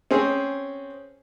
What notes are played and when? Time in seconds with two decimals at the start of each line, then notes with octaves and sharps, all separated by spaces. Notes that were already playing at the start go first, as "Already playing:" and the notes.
0.11 C4 C#4 G#4